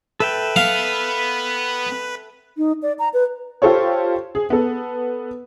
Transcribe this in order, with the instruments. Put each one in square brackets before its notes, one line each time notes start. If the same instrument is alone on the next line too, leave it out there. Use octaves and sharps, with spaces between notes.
[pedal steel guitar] A4 E5 G5 [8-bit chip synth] B4
[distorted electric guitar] B3 [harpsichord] F5
[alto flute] D#4
D5
A#5
B4
[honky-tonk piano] F4 G4 A4 C5 C#5
G#4
B3 A4